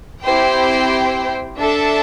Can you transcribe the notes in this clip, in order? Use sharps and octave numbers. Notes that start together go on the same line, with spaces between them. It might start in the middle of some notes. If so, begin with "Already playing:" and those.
C4 E4 G4 C5 G5
D4 A4 E5 A5